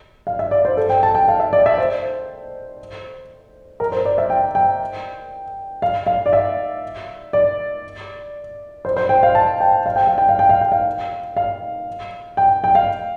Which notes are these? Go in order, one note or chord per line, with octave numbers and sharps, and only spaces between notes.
F5
E5
D5
C5
A4
G5
A5
G5
F5
E5
D5
E5
C5
A#4
C5
D5
E5
G5
G5
F5
F5
D5
E5
D5
C5
C5
G5
F5
A5
G5
F5
G5
F5
G5
F5
G5
F5
G5
F5
F5
G5
G5
F5